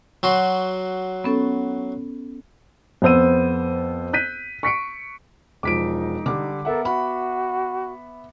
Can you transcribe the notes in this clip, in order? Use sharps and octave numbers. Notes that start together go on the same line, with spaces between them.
F#3 F#4 C6
B3 C#4 A4
F2 B3 C5 E6 D#7
F#6 G6 B6 D#7
C#6 B6 C#7 D7
E1 F3 D#4 D6 B6 D7
D3 G3 D6
B3 A4 A#4 E5 F#5
F#4 B5